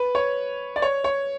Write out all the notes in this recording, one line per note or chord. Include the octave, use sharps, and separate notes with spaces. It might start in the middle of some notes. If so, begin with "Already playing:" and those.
Already playing: B4
C#5
D5
C#5
C#5